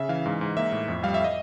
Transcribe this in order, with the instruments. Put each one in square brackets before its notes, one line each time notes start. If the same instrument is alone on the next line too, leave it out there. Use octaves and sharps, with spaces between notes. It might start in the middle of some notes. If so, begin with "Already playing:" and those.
Already playing: [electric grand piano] C#3 E5
E3 F5
G#2
G#2
A#3 E5
A2
F2
G3 F5
E5
D#5